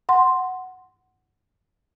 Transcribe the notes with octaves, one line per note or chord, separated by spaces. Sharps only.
F#5 C6